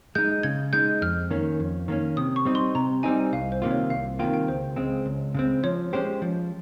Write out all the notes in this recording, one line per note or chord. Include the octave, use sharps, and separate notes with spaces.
G#3 D#4 G6
C#3 G#6
G#3 D#4 G6
F2 F6
D#3 A#3 C#4
F2
D#3 A#3 C#4
C3 D#6
C#6
G3 C4 D#4
C6
C3 A#5
G3 C4 D#4 G#5
C2 F5
C5
C3 D#3 A#3 F4
C#5
C2 F5
C3 D#3 A#3 F4 G5
G5
C#2 C5
C#3 G#3 C4
C#2
C#3 G#3 C4
F3 C#5
G#3 C#4 G4 C5
F3